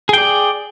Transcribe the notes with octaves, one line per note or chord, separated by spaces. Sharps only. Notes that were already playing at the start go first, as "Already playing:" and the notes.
G#4 D5 G5